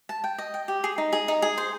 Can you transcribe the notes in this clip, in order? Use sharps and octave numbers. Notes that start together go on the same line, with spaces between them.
A5
G5
D#5
G5
G4
G#4
D#4
G#4
D#4
G#4
C5